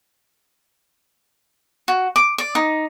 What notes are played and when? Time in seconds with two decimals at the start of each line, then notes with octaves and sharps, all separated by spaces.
1.88 F#4
2.16 D6
2.38 D5
2.55 D#4